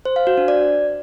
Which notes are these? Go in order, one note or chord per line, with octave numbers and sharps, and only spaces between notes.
C5
F5
F#4
D4
D5